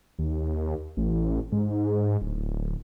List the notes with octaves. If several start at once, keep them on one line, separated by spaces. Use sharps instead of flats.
D#2
A1
G#2
D1